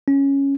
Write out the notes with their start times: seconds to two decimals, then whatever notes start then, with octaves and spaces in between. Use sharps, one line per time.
0.08 C#4